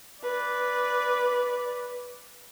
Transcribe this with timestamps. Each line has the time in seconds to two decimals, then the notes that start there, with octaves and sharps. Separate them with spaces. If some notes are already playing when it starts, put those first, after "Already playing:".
0.22 B4 D5